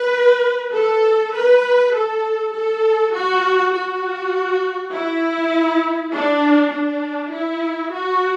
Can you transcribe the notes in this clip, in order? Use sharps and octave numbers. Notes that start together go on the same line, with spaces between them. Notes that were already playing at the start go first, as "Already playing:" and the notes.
Already playing: B4
A4
B4
A4
A4
F#4
F#4
E4
D4
D4
E4
F#4